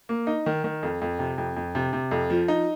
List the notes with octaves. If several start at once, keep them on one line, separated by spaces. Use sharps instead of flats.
A#3
D#4
D#3
D#3
F2
F2
C3
F2
F2
C3
C3
F2
F3
D#4